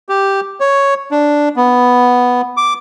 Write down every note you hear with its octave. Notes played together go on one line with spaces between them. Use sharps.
G4
C#5
D4
B3
D6